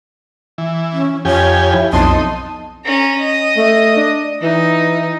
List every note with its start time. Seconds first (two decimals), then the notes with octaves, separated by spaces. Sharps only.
0.58 E3
0.92 C#4
1.25 F2 G4 C#5 G#5
1.74 E4
1.93 B1 F2 D#4 A5 C6
2.85 C#4 A#5
3.20 D#5
3.57 A3
3.96 D4
4.42 E3 D#4